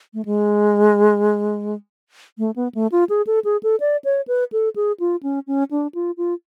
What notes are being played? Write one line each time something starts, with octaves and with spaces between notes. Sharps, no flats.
A3
G#3
A3
B3
A3
F4
G#4
A4
G#4
A4
D5
C#5
B4
A4
G#4
F4
C#4
C#4
D4
F4
F4